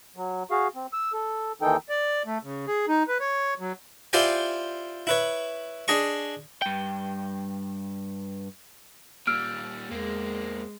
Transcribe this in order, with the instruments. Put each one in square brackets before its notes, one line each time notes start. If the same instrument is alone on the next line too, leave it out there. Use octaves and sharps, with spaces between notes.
[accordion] F#3
F#4 G#4 F5
C4
E6
A4
D#2 D#3 E3 D#4 A4 G5
D5
A3
C#3
G#4
D#4
B4
C#5
F#3
[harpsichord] E4 F4 G4 C5 D5 G#5
E4 B4 C#5
D4 G#4 D#5 C#6
[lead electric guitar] G2 G5
[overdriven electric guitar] A#2 G3 [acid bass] A#3 [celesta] E6 F6 D7
[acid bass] E2 [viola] G#3 [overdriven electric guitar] A#3 C4